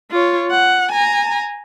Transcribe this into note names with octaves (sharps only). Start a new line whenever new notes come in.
F4 C#5
F#5
G#5 A#5